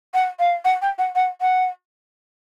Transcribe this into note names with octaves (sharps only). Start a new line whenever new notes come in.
F#5
F5
F#5
G5
F#5
F#5
F#5